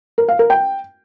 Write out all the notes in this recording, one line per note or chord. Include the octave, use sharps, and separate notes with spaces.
A#4
F5
A#4
G5